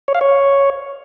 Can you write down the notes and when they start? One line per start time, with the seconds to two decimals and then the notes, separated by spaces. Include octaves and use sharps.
0.08 C#5
0.15 F5
0.21 C#5